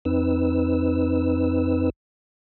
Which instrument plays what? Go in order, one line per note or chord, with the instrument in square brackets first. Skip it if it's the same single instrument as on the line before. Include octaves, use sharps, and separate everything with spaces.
[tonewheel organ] F2 C4 D#4 B4 E6